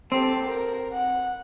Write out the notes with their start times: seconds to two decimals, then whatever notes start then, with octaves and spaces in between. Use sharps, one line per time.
0.12 C4 G4 A4
0.46 A#4
0.92 F#5